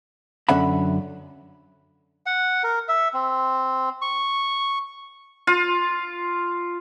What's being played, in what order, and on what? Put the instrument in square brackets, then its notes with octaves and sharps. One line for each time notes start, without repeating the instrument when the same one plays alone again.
[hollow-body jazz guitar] F#2 D3 C#4 E5 F#5 B5
[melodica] F#5
A#4
E5
C4
C#6
[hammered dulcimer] F4